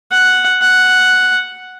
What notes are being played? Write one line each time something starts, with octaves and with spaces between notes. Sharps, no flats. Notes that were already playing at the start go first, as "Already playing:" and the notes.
F#5
F#5